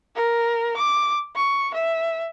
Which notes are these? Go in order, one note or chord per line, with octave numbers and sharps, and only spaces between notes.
A#4
D6
C#6
E5